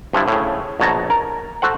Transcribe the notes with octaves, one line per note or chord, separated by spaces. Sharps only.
G2 F3 D4 E4
A2 C#3
A#1 B2 C#5 A5 A#5
A#4
F#4 A4 C5 F#5